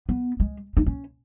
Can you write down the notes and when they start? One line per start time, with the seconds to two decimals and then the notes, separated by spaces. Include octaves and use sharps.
0.09 B3
0.40 G#3
0.77 D#4
0.86 C#4